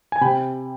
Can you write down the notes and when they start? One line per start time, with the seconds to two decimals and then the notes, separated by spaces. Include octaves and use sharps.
0.12 G#5
0.21 C3 G5 B5